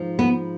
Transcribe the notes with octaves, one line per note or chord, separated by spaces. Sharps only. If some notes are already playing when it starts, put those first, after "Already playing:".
Already playing: G#2 F3
B3